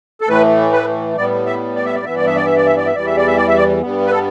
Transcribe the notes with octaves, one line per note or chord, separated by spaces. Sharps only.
A4
A2 E3 A3 B4
B4
A2 G3 B3 D5
E5
D5
E5
D5
G2 E3 B3 E5
D5
E5
D5
E5
D5
E5
D5
E5
E2 E3 G3 D5
E5
D5
E5
D5
E5
D5
G2 G3 B3
B4
A4